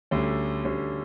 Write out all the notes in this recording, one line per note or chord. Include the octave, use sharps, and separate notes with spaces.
D2 D3 G3 C#4
D2 D3 G3 C#4